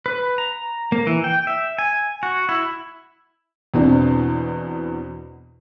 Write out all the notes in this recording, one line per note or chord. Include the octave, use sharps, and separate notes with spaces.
B4
A#5
A#3
E3
G5
E5
G#5
F#4
E4
E2 B2 C4 D4